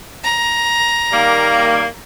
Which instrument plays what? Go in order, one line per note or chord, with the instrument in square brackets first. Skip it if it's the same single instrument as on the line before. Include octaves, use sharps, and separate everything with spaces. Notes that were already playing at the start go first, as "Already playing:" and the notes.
[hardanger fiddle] A#5
[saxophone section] D#3 G3 A#3